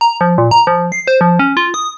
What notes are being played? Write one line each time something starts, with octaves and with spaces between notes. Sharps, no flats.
A#5
F3
A#2
A#5
F3
C7
C5
F3
C#4
F4
D#6